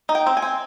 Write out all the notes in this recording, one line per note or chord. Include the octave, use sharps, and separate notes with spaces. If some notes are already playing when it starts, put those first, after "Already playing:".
D#4
G5
C4
G#5
C4